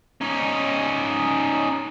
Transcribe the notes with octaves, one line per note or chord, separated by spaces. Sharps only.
C#4 D#4